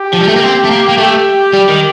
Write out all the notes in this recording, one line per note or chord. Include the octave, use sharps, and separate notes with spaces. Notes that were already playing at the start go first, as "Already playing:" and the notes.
Already playing: G4
F3
G3
A3
A#3
C4
A3
A#3
A#3
A3 G4
G3
D#3